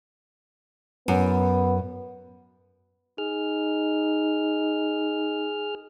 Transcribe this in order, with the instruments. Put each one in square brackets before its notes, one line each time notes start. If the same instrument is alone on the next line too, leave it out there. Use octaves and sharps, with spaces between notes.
[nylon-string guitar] F#2 [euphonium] B3
[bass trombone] D#4 [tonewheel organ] G#4 F6